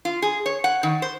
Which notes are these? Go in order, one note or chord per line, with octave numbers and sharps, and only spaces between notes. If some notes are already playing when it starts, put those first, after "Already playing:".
F4
G#4
C#5
F#5
D#3
C5